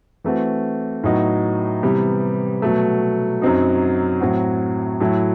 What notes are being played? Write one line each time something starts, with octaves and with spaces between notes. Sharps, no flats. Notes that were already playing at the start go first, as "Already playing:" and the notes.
E3 A3 C4 F#4
A2 F#3 B3 D#4 F#4
C3 E3 G3 B3
B2 F#3 A3
F#2 F#3 C4 D#4
A2 F#3 C4 F#4
A2 F#3 A3 E4